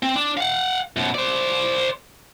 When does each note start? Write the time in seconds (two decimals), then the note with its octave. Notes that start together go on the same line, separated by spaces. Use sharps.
0.03 C4
0.16 D4
0.37 F5 F#5
0.97 F#2 B2
1.15 C5 D5